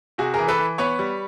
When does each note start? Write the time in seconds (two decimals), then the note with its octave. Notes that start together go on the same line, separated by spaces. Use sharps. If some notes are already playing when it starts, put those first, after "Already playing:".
0.18 C3 F#4 G#4
0.34 E3 G#4 A#4
0.48 A4 B4
0.58 E3
0.78 B3 B4 C#5
0.99 G3